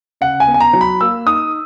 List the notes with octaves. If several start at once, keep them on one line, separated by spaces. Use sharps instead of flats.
C#3 F#5
G#5
B3
G#5
A#5
F#3
B5
A#3 E6
D#4 D#6